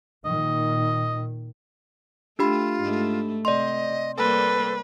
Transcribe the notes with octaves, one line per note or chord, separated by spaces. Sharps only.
A#2 D#3 D#5
A3 D4 F4 G4 B5
G#2 A3
C3 D5 D#5 C6
G3 A#3 A4 B4 C5